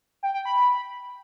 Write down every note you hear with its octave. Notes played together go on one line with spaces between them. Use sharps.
G5
G5
B5